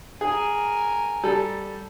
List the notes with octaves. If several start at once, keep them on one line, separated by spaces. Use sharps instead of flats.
G#4 A#4 G#5
G3 A4